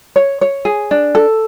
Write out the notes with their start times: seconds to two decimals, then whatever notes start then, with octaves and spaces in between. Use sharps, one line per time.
0.16 C#5
0.41 C#5
0.65 G#4
0.91 D4
1.15 A4